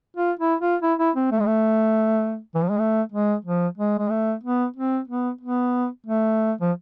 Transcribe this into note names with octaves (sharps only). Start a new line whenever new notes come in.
F4
E4
F4
E4
E4
C4
A3
G#3
A3
E3
F3
G#3
A3
G#3
F3
G#3
G#3
A3
B3
C4
B3
B3
A3
F3